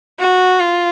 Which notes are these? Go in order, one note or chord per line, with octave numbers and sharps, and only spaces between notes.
F#4
F4